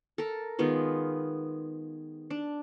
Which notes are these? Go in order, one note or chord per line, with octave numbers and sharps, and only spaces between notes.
A4 A#4
D#3 G#3 B3 F4
D4